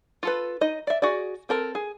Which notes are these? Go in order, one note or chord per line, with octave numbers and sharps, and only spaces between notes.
F4 A4 B4
D#4 D#5
D5 E5
F#4 G#4 D5
C4 A4 A#4
G#4